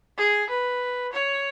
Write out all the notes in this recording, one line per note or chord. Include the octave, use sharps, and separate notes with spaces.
G#4
B4
C#5